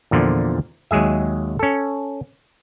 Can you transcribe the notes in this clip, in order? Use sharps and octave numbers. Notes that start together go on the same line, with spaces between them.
E2 A#2 D3 F3
D#2 F#3 G#3 G#4 E5
C#4 A4